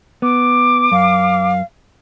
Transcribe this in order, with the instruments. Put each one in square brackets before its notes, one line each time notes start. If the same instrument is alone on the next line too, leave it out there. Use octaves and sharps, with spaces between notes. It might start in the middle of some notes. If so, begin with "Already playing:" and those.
[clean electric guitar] B3 [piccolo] D6
[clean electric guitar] F#2 [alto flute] F5